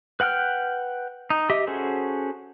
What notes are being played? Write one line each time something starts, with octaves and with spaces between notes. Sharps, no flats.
B4 F#5 G5 F6
D#4
G4 D#5 E5
C#4 F#4 G#4 A4 C5